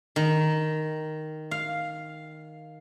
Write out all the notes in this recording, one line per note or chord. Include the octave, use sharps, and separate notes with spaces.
D#3
F5